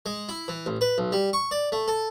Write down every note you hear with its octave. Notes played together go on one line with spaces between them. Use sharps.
G#3
E4
E3
A1
B4
B1
G3
C#6
D5
A3
A4